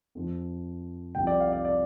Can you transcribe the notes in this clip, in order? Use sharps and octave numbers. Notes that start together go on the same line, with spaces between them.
F2 F3
C2 C3 F3 G5
D5
F5
D5
D5